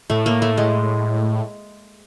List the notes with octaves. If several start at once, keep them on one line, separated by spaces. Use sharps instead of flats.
A2 A3
A#3
A3
G#3